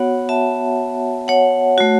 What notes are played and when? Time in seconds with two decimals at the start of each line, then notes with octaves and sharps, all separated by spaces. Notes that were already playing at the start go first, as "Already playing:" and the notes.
Already playing: B3 F#4 C#5 F#5
0.29 E5 A5
1.28 C#5 F#5
1.78 A3 F#4